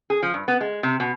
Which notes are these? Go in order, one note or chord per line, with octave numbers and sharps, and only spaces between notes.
G#4
F3
G2
B3
G#3
C3
B2